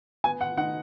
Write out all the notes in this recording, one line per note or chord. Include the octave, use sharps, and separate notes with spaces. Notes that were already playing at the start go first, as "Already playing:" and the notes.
B3 G#5
F#5
D#4 F#5